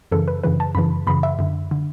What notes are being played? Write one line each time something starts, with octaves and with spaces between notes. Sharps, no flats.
F#2 C#3 E3 A4
B4
F#2 C#3 E3 B4
A5
F#2 C#3 E3 B5
F#2 C#3 E3 B5
E5
F#2 D3
D3